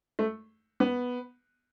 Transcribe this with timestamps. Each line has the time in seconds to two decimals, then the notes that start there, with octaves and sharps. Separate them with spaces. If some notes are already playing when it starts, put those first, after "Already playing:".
0.19 A3
0.80 B3